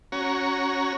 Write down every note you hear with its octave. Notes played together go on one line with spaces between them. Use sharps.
C#4 F#4 C#5 A#5